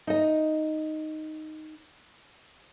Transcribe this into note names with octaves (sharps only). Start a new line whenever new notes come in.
D#4 D#5